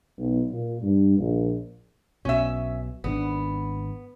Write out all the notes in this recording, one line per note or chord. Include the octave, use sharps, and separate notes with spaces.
B1
A#2
G2
A#1
B1 B2 C#4 E5
G#1 C3 B3 D4